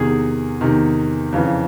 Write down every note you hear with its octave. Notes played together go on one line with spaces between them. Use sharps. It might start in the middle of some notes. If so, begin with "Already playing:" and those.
Already playing: E2 C3 D#3 G#4
E2 C3 D#3
F2 C#3 E3